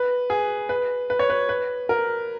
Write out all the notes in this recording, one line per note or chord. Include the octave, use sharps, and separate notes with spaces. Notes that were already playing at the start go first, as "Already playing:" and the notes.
Already playing: B4
G#4
B4
B4
C#5
B4
B4
A#4